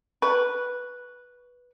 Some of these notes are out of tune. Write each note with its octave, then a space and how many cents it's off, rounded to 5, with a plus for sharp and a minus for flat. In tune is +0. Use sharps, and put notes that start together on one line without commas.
B4 -5 C#6 +15